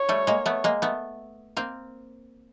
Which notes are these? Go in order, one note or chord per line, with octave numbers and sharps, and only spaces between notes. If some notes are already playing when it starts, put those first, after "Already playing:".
Already playing: C#5
G3 A3
G#3 A#3
A3 B3
G#3 A#3
A3 B3
A#3 C4